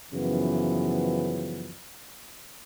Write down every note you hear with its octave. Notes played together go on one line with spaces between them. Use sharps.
F#2 C#3 E3 F3 B3